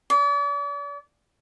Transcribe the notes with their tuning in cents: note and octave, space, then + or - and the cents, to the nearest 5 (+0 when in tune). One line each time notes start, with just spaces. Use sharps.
D5 -40